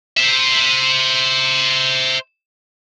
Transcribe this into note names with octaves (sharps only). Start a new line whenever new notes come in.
C5 E5